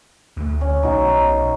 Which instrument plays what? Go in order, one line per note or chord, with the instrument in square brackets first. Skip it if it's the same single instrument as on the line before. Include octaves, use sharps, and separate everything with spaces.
[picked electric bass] D2 A3
[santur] C#4
[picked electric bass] B1 [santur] D#4 F#4 E5
[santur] A#4